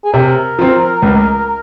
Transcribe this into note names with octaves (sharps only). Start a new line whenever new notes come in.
G#4
C3 A#4
F3 C4
C#2